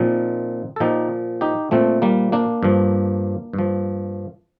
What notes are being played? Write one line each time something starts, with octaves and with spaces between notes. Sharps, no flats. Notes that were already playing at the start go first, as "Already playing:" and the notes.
Already playing: A#2 F3 C4 D#4
A4
A#2 F3 D#4 G4
D#4 G4
A#2 F3 A3 C4
G3 A#3
A#3 D4
G2 F3
G2
F3